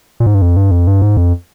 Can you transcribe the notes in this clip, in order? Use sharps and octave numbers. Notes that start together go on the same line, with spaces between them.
A#2
G#2
G2
F2
G2
F2
G2
G#2
F2